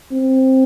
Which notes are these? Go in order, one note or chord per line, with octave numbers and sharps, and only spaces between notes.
C4